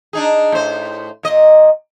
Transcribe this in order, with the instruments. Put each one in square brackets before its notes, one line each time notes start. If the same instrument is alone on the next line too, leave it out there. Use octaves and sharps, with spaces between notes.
[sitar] D4 D#4 G#4
A2 C5
A#2 D#5